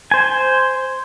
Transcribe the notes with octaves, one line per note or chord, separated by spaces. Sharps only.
C5 G#5